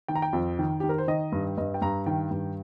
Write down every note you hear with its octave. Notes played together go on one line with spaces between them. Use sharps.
D#3 G5
A#5
G5
F2
D#3
D#3 G4
A#4
C5
D#3 D#5
G2
G2 D#5
G5
G2 A#5
D#3 G5
G2